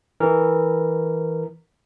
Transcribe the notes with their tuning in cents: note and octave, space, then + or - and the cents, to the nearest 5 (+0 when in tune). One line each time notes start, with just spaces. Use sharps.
E3 -15 A#4 -15